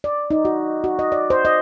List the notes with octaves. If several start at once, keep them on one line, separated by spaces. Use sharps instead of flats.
D5
D#4
F#4
F#4
D#5
D5
C5
D#5